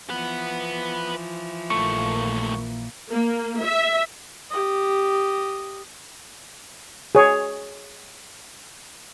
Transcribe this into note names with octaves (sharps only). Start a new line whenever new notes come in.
E3 F3 B4 F#5
A#1 D#2 A3 A#3 C#6
A#3
E5
G4 D#5
G#4 C#5